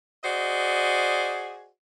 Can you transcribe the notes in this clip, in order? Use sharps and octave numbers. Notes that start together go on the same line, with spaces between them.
F#4 G#4 C5 D5 D#5